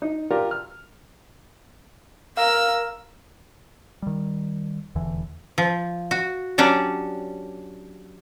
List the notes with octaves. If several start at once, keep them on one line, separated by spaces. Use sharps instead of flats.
D#4
F4 G4 A#4 D5
F6
A#4 F5 A#5 E6
D#3 G3
D#1 E2 D3 E3
F3
F#4
F#3 C#4 D4 G4